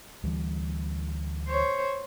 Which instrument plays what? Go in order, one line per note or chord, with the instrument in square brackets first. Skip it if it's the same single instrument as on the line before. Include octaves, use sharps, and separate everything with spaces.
[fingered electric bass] D2 E3 G3
[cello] C5 C#5